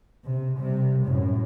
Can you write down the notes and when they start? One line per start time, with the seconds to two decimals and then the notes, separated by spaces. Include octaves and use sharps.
0.25 C3
0.57 C3 G3
1.05 F#2 A2